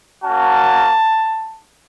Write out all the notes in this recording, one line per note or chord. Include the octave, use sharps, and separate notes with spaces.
A#3 C#4 F#4 A5